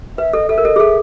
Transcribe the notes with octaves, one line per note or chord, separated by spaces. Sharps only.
B4 E5
A4 D#5
A4 E5
A#4
A4 D#5
G#4
A4 E5